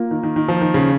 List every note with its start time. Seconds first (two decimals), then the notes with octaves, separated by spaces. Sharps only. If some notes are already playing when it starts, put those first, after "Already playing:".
Already playing: A#3 F4
0.11 D#3
0.23 D#3
0.36 D#3
0.48 F3
0.61 D#3
0.74 C#3